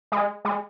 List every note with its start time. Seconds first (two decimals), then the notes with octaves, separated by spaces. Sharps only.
0.12 G#3
0.45 G#3